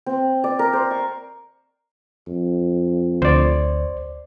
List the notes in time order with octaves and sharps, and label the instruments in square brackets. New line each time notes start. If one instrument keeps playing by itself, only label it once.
[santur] C4
D5
A#4
C5
C#6
[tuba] F2
[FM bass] D2 [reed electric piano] C5 D5